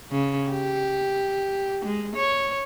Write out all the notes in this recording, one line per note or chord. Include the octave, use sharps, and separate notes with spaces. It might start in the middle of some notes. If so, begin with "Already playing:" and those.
C#3
G4
G#3
C#5